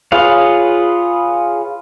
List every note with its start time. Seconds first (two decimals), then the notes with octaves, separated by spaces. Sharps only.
0.12 F4 G#4 B4 C#5 F5